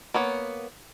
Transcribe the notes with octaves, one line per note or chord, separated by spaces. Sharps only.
A#3 B3 C#5